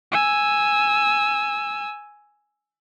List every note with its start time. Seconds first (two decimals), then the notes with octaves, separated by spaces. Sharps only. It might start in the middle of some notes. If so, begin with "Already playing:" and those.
0.12 G#5 E6